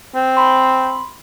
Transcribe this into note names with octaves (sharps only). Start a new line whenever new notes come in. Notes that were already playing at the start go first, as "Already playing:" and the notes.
C4
B5 C6